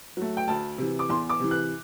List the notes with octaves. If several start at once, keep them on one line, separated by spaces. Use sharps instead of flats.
F#3 A3
G5
D2 A5
C3 E3
D6
E2 C6
D6
C3 E3
F#6